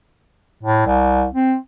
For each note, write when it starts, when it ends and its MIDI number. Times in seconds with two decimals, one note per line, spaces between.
0.63 0.84 45
0.86 1.25 36
1.33 1.55 60